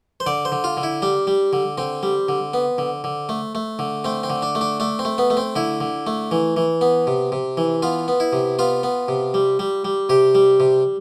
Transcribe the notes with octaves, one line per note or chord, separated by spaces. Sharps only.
C5
D3 D5
C5
D3
F4
D3
E4
G3 D4
G3
D3
D3 C4
G3
D3
B3
D3
D3
A3
A3
D3
A3 C4
C4
D3
D4
A3
D4
A3 D4
C4
A3
B3
A3
C4
D3 E4
D3
A3
E3
E3
B3
C3
C3
E3
B3 F4
B3
E4
C3
B3 F4
B3
C3
G3
G3
G3
C3 G4
G3
C3